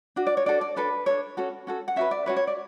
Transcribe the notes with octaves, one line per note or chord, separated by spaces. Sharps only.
D4 F#4
D5
C#5
D4 F#4 A4 D5
D5
D4 A4 B4
D4 A4 C#5
C#4 F#4 A4
C#4 F#4 A4
F#5
C#4 F#4 B4 E5
D5
C#4 F#4 B4 C#5
C#5
D5